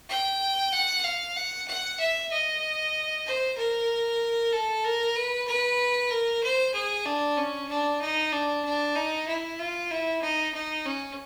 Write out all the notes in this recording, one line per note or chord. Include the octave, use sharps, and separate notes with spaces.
G5
F#5
F5
F#5
F#5
E5
D#5
C5
A#4
A4
A#4
B4
B4
A#4
C5
G#4
D4
C#4
D4
D#4
D4
D4
D#4
E4
F4
E4
D#4
D#4
C#4